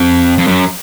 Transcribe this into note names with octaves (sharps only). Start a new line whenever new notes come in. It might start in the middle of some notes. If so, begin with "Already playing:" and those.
Already playing: F2
F2
F#2